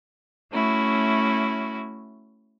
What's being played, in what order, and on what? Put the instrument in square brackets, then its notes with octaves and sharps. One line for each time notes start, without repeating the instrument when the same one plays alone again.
[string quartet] A3 C#4 E4 F#4